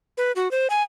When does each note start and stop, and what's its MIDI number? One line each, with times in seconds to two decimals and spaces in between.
0.17 0.32 71
0.36 0.51 66
0.51 0.68 72
0.70 0.83 80